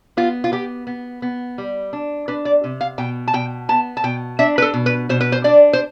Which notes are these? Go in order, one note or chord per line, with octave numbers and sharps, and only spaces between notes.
B3 F4
F4
B3 G4
B3
B3
G3
D4
D4 B4
D5
C3
F5
B2 G5
A5
B2 G5
B3 A5
A5
B2 G5
D4 E5
B4
A4
B2
B4
B2 C5
B4
C5
D4 D5
C5